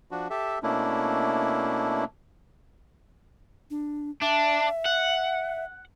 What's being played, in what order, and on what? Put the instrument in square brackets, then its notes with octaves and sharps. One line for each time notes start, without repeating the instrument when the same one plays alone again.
[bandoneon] F3 D4 F#4
G4 A4 E5
B2 A3 A#3 C#4 D4 E4
[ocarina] D4
[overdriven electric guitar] D4 [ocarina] E5
[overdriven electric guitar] F#5